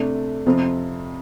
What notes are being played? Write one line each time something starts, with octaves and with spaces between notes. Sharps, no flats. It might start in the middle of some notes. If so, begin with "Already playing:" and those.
Already playing: C3 A3 D4
F2 C3 F3 C4